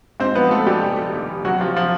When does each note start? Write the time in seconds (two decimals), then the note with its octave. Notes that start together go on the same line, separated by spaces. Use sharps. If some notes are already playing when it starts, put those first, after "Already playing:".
0.20 G#2 C4 C5
0.35 F3 B3 B4
0.51 F3 A3 A4
0.66 A#1 G3 G4
0.82 F1
0.98 F1
1.13 D#2
1.29 F1
1.45 C3 F#3 F#4
1.60 C3 F3 F4
1.76 C3 F3 F4